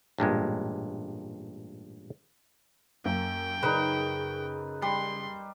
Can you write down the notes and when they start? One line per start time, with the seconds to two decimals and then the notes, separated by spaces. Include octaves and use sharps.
0.18 A1 G2 A#2 G#3
3.05 F#2 A#3 G5
3.63 C#3 D#4 B4
4.82 G3 C6